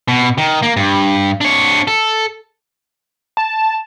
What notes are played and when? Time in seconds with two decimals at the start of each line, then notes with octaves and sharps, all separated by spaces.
0.08 B2
0.38 D#3
0.63 A#3
0.77 G2
1.41 D4 C#5
1.88 A4
3.37 A5